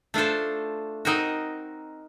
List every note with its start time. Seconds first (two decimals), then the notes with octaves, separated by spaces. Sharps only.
0.14 A3 D4 F4 A4 C5
1.05 C4 D#4 F#4 A#4 D#5